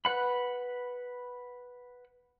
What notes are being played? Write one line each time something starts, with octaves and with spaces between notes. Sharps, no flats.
B4 F#5 B5